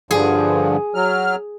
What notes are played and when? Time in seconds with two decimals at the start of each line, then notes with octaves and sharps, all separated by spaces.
0.11 G2 D3 F3 G#4
0.95 F#3 F6